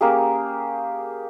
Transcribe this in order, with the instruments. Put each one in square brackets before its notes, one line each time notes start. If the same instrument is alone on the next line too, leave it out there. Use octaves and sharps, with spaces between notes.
[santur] A#3 C#4 G4 G#4